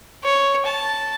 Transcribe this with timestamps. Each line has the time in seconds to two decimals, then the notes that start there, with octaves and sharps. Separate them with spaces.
0.24 C#5
0.65 A5